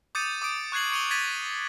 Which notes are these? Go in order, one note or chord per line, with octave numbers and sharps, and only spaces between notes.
D6 D#6 G6 A6 C#7 D#7
D6 D#6 D7
C#6 F#6 G#6 C7 F#7
C#6 C#7 D#7 F7 G7
G#6 A6 B6 D#7 F7